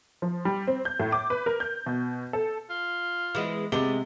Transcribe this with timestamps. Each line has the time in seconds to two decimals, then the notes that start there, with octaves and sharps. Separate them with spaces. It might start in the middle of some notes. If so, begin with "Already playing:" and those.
0.22 F3
0.45 G3
0.67 C4
0.85 G6
1.00 A2
1.12 D6
1.30 B4
1.46 A#4
1.60 G6
1.86 B2
2.33 A4
2.69 F4
3.35 E3 G#3 B3
3.72 C3 G#3 B3 D5 G7